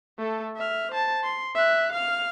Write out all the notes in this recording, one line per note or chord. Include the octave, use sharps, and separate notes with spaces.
A3 A4
E5 F6
C5 A5
C6
E5 F#6
F5 F6